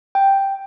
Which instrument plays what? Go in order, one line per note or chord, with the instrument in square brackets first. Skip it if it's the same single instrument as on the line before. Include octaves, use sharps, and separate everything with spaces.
[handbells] G5